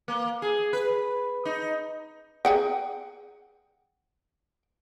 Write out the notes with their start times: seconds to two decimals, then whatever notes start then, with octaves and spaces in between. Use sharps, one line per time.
0.08 A#3
0.42 G#4
0.73 B4
1.45 D#4
2.45 G#4 F#5 G5